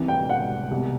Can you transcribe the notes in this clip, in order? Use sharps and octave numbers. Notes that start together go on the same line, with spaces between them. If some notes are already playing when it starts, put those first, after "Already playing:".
Already playing: C2 C3 E3
G5
F#5
C2 B2